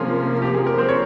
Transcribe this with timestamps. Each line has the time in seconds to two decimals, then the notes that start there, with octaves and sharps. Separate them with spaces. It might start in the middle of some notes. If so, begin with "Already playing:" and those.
Already playing: C3 F3 A#3 C#4 F4 G#4 G#5
0.42 G4
0.55 G#4
0.67 A#4
0.78 C4 C5
0.89 C#5